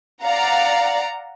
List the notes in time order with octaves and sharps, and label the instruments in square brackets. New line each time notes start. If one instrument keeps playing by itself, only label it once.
[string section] D5 F5 F#5 A#5